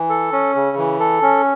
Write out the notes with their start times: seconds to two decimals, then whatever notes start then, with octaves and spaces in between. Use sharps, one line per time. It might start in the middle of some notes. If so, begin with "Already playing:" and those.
Already playing: E3
0.10 A4
0.32 C#4
0.55 C#3
0.77 E3
0.99 A4
1.22 C#4